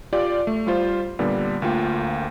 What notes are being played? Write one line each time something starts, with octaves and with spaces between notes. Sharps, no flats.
F4 G4 D5 D6
A3
G3 F4 C5
A#2 D3 G3 B3
D2 A#3 F4 G5